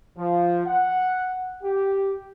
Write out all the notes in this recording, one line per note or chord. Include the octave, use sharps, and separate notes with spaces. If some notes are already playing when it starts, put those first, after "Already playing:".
F3
F#5
G4